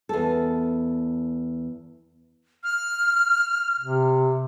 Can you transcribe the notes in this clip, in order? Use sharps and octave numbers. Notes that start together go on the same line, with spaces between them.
E2 A4
F6
C3